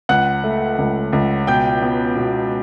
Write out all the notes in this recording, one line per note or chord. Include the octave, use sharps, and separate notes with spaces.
C#2 F#5 F#6
A3
C#2
C#2
B2 G5 G6
B3
B2